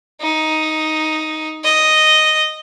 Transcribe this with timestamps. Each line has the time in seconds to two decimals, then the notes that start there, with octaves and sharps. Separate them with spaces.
0.21 D#4
1.64 D#5